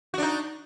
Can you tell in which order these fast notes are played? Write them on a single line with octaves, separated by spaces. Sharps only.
F#4 D4 D#4